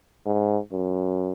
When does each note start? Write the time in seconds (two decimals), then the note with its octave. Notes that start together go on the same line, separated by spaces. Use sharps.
0.26 G#2
0.72 F#2